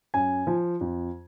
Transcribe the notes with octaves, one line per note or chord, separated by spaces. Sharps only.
F#2 G#5
F3
F2